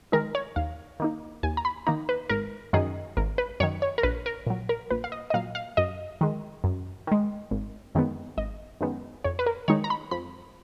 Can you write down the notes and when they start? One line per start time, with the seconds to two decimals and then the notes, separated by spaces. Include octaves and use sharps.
0.12 D#3 G#3 D#4 A#4
0.35 C#5
0.56 D#2 F5
1.00 D#3 A#3 D#4
1.43 D#2 G#5
1.57 A#5
1.65 B5
1.87 D#3 A#3 D#4 A#5
2.09 B4
2.29 G#1 A#4
2.73 F#2 D#3 G#4
3.17 G#1 A#4
3.38 B4
3.60 F#2 C#5
3.63 D#3
3.82 C#5
3.98 A#4
4.03 A#1 B4
4.26 A#4
4.47 A#2 F#3
4.69 A#4
4.90 A#1 B4
5.04 F5
5.12 D#5
5.30 D#5
5.34 A#2 F#3 F5
5.55 F5
5.77 F#2 D#5
6.21 D#3 G#3
6.64 F#2
7.07 D#3 G#3
7.51 G#1
7.95 F#2 D#3 G#3 B3
8.37 G#1 D#5
8.81 F#2 D#3 G#3 B3
9.24 F2 C#5
9.39 B4
9.46 A#4
9.68 D#3 G#3 D#4 C#5
9.84 A#5
9.90 B5
10.11 F2 B5